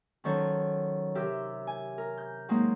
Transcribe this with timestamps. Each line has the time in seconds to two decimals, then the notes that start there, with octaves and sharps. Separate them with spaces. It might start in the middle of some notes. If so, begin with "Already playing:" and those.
0.24 D#3 F#3 C#4 A4 C5 C#5
1.15 C3 G4 A#4 E5 E6
1.67 G#5
1.98 A#4
2.18 G6
2.48 F#3 G#3 A#3 C4 D#4